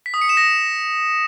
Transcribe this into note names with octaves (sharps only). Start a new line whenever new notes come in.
B6
D#6
C#7
E7
A#6